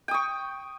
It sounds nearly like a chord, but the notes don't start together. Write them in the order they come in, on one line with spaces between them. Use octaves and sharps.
G5 D#6 C#6